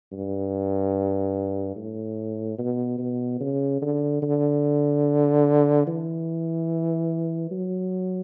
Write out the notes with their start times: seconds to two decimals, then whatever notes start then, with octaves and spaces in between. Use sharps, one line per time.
0.12 G2
1.76 A2
2.58 B2
2.99 B2
3.40 C#3
3.82 D3
4.22 D3
5.87 E3
7.51 F#3